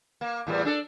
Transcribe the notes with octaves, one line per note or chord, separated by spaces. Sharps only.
A#3
E2 A2 G3
D4 A4